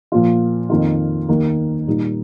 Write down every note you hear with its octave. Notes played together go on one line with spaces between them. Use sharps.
A#2 F3 A#3 F4
F2 D#3 A#3 F4
D#2 D#3 A#3
A#2 G3 D#4